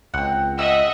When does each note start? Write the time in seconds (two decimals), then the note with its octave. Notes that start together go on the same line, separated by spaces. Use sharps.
0.14 C#2 C4 F#5
0.59 D#5 E5 F#5 E6